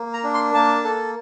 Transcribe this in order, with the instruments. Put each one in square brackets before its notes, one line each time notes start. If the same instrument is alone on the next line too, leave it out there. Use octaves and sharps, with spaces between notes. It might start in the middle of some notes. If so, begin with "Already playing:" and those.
Already playing: [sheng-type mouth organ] A#3
A#5
D4
C6
A#3 A5
A4